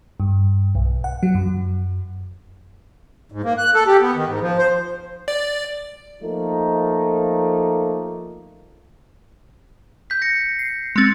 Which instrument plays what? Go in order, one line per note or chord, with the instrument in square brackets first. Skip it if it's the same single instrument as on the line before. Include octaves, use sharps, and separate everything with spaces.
[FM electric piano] G2
B1
F#5
F#3
F#2
[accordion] G#2
A#3
F#6
A4
G4
B3
D#3
G#2
F3
C5
[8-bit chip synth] D5
[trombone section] F3 A3 A#3 D#4
[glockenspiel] G6 B6
A#6 C#7
[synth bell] C7
[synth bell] G#3 C4 [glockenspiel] A6 C#7